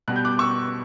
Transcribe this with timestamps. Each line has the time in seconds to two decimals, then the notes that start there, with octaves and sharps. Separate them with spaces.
0.08 B2 G3 B3 F#6
0.16 G6
0.25 D6 F#6
0.39 C#6 E6